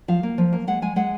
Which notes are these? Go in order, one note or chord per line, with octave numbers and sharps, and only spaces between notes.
F3 F5
A#3
F3
A#3
G#3 F#5
G#3 G#5
G#3 F#5